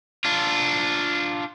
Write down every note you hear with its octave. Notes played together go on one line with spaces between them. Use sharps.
D4 F4